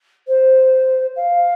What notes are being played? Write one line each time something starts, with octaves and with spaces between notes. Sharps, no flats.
C5
F5